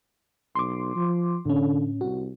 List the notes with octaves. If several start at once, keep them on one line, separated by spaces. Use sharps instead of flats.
B1 C6 D6
F3
A2 D3 C#4
C2 F#4